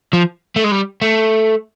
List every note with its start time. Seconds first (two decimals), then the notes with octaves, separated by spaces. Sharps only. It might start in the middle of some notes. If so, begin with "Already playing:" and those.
0.13 F3
0.56 A3
0.64 G#3
0.71 G3
1.01 A3